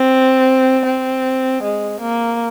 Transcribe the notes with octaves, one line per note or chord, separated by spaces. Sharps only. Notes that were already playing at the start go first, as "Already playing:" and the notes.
Already playing: C4
C4
G#3
A#3